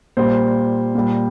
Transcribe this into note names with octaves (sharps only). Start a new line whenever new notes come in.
A#2 G3 C5
A#2 G3